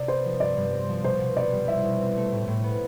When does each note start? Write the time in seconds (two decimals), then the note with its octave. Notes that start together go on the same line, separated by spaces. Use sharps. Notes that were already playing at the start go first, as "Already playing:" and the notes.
Already playing: C3 D5
0.08 B3 C5
0.25 F3
0.40 G2 D5
0.57 G2
0.73 C4
0.89 F3
1.04 B2 C5
1.20 B2
1.36 B3 D5
1.53 G3
1.68 E4 E5
1.85 B2
2.00 C4
2.16 A3
2.32 A2
2.47 A2
2.64 B3